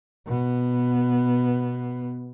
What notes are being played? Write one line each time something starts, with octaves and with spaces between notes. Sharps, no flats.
B2 B3